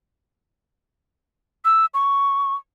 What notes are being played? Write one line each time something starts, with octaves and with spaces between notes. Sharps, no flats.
E6
C#6